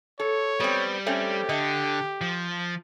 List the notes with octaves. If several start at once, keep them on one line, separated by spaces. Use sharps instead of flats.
A4 C#5
G3 B3 C4
A3 C4 C#4 G4
D3 D#5
F3